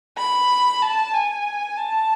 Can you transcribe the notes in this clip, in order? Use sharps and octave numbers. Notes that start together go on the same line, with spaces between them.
B5
A5
G#5
A5